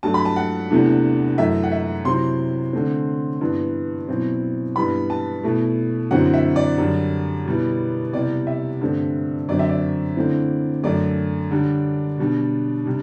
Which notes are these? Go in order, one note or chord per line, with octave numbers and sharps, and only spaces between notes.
G2 F#3 A3 A5
B5
A5
F#5
E2 C3 E3 A3 D4
F#2 E3 A3 E5
F#5
E5
C3 F#3 C4 E4 C6
D3 A3 C4
G2 E3 B3
B2 F#3 C4 E4
G2 E3 G3 B3 B5
A5
B2 A3 E4
F#2 D3 F#3 C4 E4 F#5
E5
D5
F#2 D3 G3 D4
B2 G3 B3 E4
E2 C3 E3 G3 D5
E5
G2 D3 A3 C4
F#2 D3 F#3 C4 D5
E5
D5
D3 A3 C4 E4
F#2 D3 A3 D5
D3 G3 D4
B2 G3 D4
C3 G3 D4